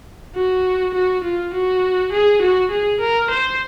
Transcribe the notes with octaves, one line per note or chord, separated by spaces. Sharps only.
F#4
F#4
F4
F#4
G#4
F#4
G#4
A#4
C5